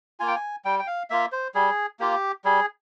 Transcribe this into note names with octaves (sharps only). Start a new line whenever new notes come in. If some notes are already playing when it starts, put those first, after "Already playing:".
A#3 F4 G#5
G5
G#5
G3 G5
G5
F5
A#3 F4 E5
C5
G3 G#4
A#3 F4 G4
G3 G#4